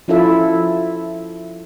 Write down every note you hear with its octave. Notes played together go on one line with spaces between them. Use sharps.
F3 C#4 E4 F4 A4 E5